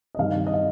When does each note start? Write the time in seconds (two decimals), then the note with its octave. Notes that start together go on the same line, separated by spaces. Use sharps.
0.15 D#5
0.19 G2 D#3 G3 F5
0.47 D#5
0.53 F5